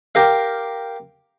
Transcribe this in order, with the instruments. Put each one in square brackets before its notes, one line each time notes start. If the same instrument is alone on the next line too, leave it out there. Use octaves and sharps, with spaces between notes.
[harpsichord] G4 A#4 F5